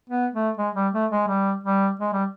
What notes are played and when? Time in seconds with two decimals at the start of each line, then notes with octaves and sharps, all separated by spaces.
0.10 B3
0.33 A3
0.57 G#3
0.75 G3
0.93 A3
1.11 G#3
1.28 G3
1.63 G3
1.99 G#3
2.13 G3